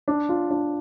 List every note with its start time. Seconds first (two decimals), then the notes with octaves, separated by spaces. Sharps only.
0.08 D4
0.29 F4
0.50 D4